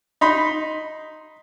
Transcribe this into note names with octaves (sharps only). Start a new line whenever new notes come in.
D#4 B5 C6